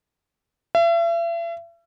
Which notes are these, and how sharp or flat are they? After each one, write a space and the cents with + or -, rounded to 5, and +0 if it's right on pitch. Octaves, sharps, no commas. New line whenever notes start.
E5 +40